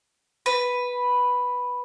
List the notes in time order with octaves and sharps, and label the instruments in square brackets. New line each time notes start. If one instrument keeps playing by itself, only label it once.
[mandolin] B4